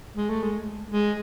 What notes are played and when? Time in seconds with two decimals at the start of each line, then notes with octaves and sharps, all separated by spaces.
0.16 G#3
0.29 A3
0.43 G#3
0.90 G#3